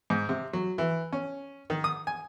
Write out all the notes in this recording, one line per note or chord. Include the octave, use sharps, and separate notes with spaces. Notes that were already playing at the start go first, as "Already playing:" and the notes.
G#2
C3
F#3
E3
C#4
D#3
D#6
G#5